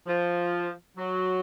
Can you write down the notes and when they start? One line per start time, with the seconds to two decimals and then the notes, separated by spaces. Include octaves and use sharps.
0.07 F3
0.96 F#3